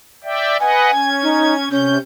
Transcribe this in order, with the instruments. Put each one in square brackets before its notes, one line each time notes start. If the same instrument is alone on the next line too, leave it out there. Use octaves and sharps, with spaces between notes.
[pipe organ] D5 E5 G5
[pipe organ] B4 D#5 F#5 [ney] G#5
[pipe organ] C#4 G#6
[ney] D#4
[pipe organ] C3 G6 [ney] C#4